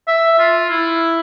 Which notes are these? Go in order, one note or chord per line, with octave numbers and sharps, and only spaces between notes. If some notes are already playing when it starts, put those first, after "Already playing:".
E5
F4
E4